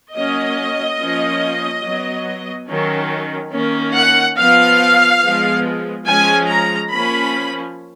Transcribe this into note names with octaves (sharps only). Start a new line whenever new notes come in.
F#3 A#3 C#4 D#5
F3 A#3 C#4
F#3
B3
D#3 F#3 C#4
D#3 A#3 C#4
F#5
F3 B3 F5
F3 G#3 B3
F3 G#3 C#4 G#5
A#5
F3 A#3 C#4 B5